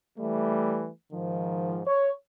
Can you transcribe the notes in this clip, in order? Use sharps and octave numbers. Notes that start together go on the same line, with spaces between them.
E3 G3 A3
G#2 D#3 F3
C#5